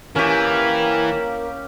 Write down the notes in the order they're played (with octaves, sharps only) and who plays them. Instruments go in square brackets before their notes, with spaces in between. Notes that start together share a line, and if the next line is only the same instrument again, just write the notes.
[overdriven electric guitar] E3 [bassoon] A#3 [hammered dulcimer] C#4 G4